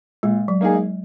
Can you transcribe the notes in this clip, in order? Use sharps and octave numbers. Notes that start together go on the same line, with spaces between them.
A#2 G#3
F#3
A#3 D#4 G#4
G#3